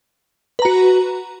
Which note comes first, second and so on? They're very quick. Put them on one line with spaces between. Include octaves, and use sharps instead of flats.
B4 A#5 F#4